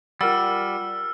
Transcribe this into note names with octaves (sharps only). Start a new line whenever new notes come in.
G3 F4 A#4 F#5 E6 F6